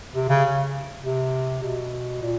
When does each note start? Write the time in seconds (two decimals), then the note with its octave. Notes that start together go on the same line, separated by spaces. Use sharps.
0.14 C3
0.29 C#3
1.02 C3
1.62 B2
2.22 A#2